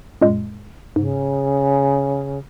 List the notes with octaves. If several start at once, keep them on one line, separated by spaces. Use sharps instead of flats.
F#2 A#2 G#3
G#2 C#3